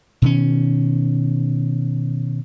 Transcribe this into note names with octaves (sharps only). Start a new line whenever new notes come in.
B2 D#3 C#4